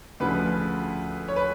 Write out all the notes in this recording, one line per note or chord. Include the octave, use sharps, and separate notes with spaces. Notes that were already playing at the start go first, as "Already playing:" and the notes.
D2 C#3 F3 B4
C#5
B4